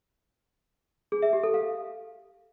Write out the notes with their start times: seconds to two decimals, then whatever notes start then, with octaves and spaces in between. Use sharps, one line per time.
1.12 G#4
1.22 E5
1.33 G4
1.43 A4
1.54 F5